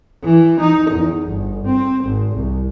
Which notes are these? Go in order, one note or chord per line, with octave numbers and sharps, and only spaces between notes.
E3
D#4
E2
G1
C4
G#1
C2